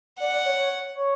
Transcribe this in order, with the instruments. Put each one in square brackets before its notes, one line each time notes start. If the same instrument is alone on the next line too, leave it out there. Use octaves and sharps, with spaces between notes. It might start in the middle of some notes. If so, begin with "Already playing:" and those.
[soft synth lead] D5 [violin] F#5
[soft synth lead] D5
C#5
C#5
C#5